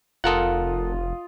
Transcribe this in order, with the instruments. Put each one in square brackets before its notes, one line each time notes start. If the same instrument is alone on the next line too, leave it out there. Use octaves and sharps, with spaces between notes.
[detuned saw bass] F1 [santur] F4 D#5 [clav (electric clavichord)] A4 A#4 F#5